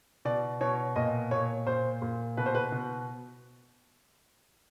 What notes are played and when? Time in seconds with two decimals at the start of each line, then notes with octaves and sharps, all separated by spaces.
0.25 B2 D5
0.61 B2 C#5
0.96 A#2 D#5
1.31 A#2 C#5
1.67 A#2 C5
2.02 A#2
2.37 B2 B4
2.46 C5
2.55 B4
2.72 B2